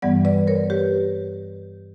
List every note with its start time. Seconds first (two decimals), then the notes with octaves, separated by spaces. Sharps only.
0.02 G2 E3 G3 B3 D5 F#5
0.25 B4 D5
0.47 A#4 C#5
0.70 G4 B4